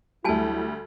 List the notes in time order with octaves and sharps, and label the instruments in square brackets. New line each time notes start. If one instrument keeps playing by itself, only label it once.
[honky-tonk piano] D2 G3 [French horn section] F#3 A3 E4 [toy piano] F#4 G#5 A5